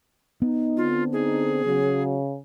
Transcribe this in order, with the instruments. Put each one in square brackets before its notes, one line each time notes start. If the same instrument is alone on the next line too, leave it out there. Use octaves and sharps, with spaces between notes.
[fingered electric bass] B3 [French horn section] D#4
[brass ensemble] D3 C4 [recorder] F4
[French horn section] D#4 [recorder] G#4
[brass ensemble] C#3 [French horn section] F#3